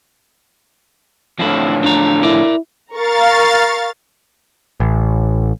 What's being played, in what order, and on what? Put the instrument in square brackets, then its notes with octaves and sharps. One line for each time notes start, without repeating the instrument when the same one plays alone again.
[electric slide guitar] A2 D3 F3 [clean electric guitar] C4 E4
[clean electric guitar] D4 A#5
[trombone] E4 [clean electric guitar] A#4 D5
[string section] A#4 A#5 C#6 [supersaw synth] F5 A6
[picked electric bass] A1